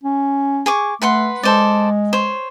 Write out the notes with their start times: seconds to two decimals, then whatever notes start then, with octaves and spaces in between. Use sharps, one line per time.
0.03 C#4
0.66 G#4 C#6 D6
1.02 A3 B4 F#5 C6
1.43 G#3 A4 C5 D5
2.13 C5 C#5